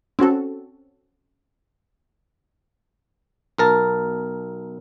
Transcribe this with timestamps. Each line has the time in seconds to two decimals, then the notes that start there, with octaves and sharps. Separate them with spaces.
0.19 C4 C#4 F#4 A4
3.58 B1 A#4 A5